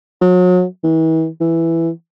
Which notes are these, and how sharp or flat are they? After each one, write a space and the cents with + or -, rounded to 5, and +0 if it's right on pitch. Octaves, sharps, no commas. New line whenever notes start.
F#3 -35
E3 -40
E3 +5